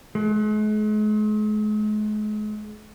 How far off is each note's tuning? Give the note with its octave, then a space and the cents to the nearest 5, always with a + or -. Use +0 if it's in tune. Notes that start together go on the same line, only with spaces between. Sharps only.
G#3 +40